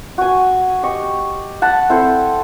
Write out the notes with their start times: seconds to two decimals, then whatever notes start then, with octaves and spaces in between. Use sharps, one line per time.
0.18 F#4 G#5
0.83 G4 D#5 C#6
1.62 F#5 A5 B5
1.89 C4 E4 A4 C5